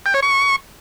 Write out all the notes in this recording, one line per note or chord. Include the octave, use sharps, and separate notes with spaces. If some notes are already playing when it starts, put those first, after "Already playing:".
G5
C#5
C#6